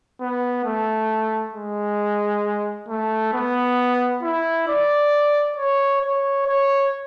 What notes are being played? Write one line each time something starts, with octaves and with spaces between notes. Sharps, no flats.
B3
A3
G#3
A3
B3
E4
D5
C#5
C#5
C#5